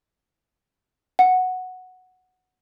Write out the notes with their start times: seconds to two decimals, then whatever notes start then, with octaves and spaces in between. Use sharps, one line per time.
1.19 F#5